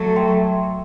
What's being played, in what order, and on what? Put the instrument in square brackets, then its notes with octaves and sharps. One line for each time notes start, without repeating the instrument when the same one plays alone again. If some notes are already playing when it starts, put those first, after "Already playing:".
Already playing: [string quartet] F#3 A3
[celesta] A4 E5 G5 C6